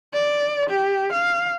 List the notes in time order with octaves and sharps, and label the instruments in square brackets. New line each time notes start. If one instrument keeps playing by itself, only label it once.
[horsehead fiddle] D5
G4
F5